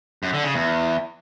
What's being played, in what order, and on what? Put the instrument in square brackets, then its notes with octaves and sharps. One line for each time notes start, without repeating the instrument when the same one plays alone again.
[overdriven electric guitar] F#2
D3
C#3
E2